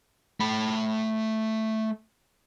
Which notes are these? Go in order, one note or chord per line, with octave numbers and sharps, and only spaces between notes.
A3 B5